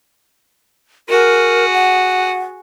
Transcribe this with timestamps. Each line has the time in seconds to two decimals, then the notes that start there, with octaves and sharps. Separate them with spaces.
1.09 F#4 G#4 A#4
1.73 F#5